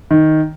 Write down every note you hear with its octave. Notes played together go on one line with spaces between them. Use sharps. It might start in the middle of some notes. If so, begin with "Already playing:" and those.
D#3